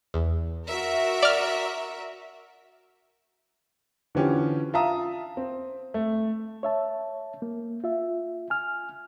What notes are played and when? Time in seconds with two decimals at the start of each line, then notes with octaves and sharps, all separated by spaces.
0.14 E2
0.67 F#4 A#4 E5
1.23 D5 F6
4.15 D3 E3 F3 C#4 G4
4.74 F4 E5 F5 A5 A#5 D#6
5.37 C4
5.94 A3
6.63 C#5 E5 A5
7.42 A#3
7.84 F4 E5
8.50 G#5 F6